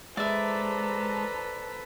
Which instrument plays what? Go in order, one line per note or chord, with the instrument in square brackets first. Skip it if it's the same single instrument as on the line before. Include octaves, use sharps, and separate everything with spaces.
[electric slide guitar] G#3 [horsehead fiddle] A4 B4 [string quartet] C5 A5 A#5 [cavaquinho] D5 E5